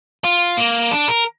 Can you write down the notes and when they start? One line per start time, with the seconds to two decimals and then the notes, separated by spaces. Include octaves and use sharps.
0.24 F4
0.57 A#3
0.91 D4
1.08 A#4